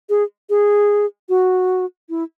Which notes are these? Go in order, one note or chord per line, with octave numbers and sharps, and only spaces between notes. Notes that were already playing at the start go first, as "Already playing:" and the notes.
G#4
G#4
F#4
E4